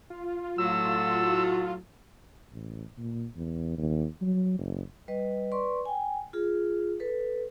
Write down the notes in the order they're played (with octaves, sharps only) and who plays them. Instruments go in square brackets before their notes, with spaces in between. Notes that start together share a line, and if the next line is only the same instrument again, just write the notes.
[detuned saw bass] F4
[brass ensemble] A2 F#4 A4 [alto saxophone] F#3 [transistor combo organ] E6
[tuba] A1
A#2
E2
D#2
F#3
F#1
[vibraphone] G3 B4 D#5
B4 D5 C6 C#6
G5 G#5
F4 G#4
A4 B4